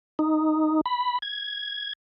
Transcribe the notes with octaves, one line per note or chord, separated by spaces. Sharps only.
D#4
B5
G#6